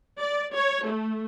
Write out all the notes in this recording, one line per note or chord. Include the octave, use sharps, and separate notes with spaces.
D5
C#5
A3